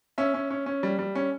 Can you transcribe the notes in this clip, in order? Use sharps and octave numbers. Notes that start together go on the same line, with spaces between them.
C#4 E5
C#4
C#4
C#4
G3
G3
C#4